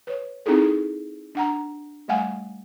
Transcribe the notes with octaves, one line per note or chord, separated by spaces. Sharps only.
B4 C#5
C4 D#4 E4 G#4 A4
D4 F#5 A#5
G3 A3 F5 F#5 G#5